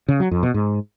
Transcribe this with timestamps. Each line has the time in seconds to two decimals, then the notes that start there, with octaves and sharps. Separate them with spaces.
0.08 C#3
0.20 F#3
0.31 F2
0.43 B2
0.54 G#2